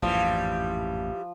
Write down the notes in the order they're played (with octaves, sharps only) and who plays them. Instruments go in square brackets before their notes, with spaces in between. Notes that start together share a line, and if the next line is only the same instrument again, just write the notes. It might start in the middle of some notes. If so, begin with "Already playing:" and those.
[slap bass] A1 F2 G#2 [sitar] E3 G3 [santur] F3